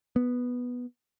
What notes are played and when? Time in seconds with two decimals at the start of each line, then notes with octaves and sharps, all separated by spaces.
0.16 B3